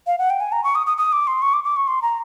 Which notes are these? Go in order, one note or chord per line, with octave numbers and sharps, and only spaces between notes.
F5
F#5
G5
G#5
A#5
C#6
D#6
D#6
D#6
D6
C6
C#6
D6
D6
C#6
C6
A#5